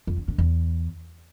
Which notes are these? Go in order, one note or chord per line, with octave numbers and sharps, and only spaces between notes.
F2
D3
D3
E2